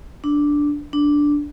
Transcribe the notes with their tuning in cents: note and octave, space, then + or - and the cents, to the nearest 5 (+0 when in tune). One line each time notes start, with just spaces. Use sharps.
D4 -5
D4 -5